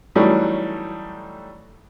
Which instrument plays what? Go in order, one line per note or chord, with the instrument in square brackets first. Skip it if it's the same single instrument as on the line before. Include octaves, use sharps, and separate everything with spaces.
[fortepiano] E3 F#3 G3 A3 C#4 D#4